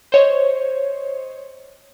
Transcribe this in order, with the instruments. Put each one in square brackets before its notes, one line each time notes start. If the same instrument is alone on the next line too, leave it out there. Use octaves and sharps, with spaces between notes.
[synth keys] C5 C#5 D#5